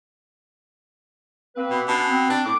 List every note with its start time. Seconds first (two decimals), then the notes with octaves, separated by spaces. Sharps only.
1.56 A#3 C4 B4
1.70 B2
1.88 B2 C#4 D4
2.09 C4
2.30 D4
2.45 A2 D6